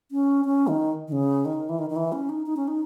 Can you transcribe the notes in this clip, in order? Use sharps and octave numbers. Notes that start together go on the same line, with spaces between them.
C#4
C#4
D#3
D#3
C#3
D#3
E3
D#3
D#3
E3
C#4
D#4
D#4
C#4
D#4